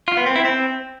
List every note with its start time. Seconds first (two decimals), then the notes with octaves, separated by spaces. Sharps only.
0.08 F4
0.17 B3
0.26 C4
0.36 E4
0.45 C4